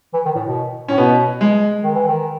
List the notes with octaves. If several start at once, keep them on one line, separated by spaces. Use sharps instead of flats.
E3
D#3
A2
B2
A2 C#4
B2 B3
G#3
D#3
E3
D#3